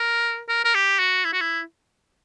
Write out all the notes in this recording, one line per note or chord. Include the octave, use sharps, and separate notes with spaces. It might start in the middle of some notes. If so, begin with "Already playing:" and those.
Already playing: A#4
A#4
A#4
G4
F#4
E4
F#4
E4